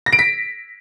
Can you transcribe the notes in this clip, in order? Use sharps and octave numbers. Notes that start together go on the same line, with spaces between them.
A#6
D7
B6